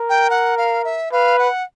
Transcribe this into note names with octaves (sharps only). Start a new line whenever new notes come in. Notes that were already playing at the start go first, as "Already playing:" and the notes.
Already playing: A#4
G5
F#5
F5
E5
B4 F5
F#5